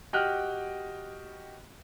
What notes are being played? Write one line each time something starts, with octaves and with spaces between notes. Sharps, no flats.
F#4 G4 D#5 G5 F6 F#6